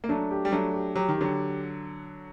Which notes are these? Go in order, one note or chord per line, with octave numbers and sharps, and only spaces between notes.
A#3
F#3 A3 D4
G4
G3
F#3 A3 D4
G4
F#3 G4
D#3
D3 F#3 G4